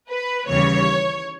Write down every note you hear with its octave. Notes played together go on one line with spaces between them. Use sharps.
B4
D#2 C#3 E3 G3 C#5